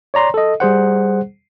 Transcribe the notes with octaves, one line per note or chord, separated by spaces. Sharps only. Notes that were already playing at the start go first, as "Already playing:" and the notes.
C#5 D5 A#5 C6
A4 D#5
G3 G#4 C5 F#5